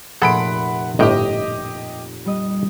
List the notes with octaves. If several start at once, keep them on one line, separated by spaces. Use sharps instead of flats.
F1 A#2 G#4 A4 F#5 B5 C6 D7
G1 A2 G4 D#5 G5
G3 D#5